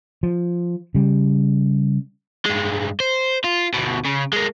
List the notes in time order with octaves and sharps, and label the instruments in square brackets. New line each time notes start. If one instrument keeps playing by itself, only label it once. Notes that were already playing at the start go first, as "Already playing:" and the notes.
[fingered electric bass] F3
C#3 G3
[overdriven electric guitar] G2 G#3
C5
F4
D2 B2
C#3
G#3 A#3